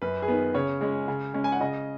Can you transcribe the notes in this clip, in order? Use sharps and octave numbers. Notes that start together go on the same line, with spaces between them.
F#2 B4
G#4
D#3 B3 B4
C#3 C#5
G#3 C#4
C#3
G#3 C#4
G#5
F#5
C#3 D#5